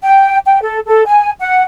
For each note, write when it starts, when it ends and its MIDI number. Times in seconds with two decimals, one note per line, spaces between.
0.02 0.38 79
0.46 0.61 79
0.62 0.78 69
0.86 1.05 69
1.05 1.30 80
1.39 1.62 78